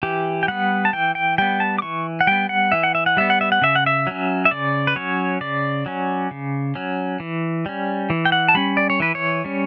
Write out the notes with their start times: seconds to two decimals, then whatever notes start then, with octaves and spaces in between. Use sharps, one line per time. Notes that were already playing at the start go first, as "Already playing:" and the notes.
0.03 E3 G4
0.43 G5
0.48 G3 B3 F#5
0.85 A5
0.93 E3 G5
1.15 G5
1.38 G3 B3 G5
1.60 A5
1.78 D6
1.82 E3 C#6
2.21 F#5
2.27 G3 B3 G5
2.49 F#5
2.72 E3 E5
2.83 F#5
2.95 E5
3.06 F#5
3.17 G3 B3 E5
3.30 F#5
3.41 E5
3.52 F#5
3.62 C#3 E5
3.76 F#5
3.86 E5
4.07 F#3 C#4
4.45 E5
4.51 C#3 D5
4.87 B4
4.96 F#3 C#4 C#5
5.41 C#3 D5
5.86 F#3 C#4
6.31 C#3
6.75 F#3 C#4
7.20 E3
7.66 G3 C#4
8.10 E3
8.25 G5
8.32 F#5
8.48 A5
8.54 G3 C#4 B5
8.77 D5
8.90 C#5
9.00 E3 B4
9.15 C#5
9.45 G3 C#4